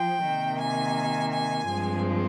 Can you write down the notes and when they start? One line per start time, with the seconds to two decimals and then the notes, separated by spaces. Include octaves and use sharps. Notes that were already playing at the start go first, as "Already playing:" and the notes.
Already playing: F3 G5
0.26 C3 D#3 A#3
0.62 G#5
1.33 G#5
1.68 G2 F3 G#3 C4